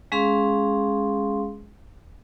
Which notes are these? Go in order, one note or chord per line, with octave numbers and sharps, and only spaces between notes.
G#3 C#4 G#4 F5 C6